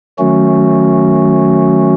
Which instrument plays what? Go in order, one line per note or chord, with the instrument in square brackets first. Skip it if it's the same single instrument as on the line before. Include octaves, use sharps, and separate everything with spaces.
[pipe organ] D#3 F#3 A3 C#4 F#4